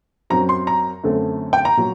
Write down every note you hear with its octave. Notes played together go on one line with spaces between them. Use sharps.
F#2 F#3 C4 A#5
C6
A#5
F#2 D3 A3 C4
G5
A#5
A#2 F#3